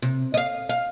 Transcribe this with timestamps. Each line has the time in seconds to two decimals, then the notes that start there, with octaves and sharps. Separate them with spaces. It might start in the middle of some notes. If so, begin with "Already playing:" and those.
0.02 C3
0.34 D#5 F5
0.69 F5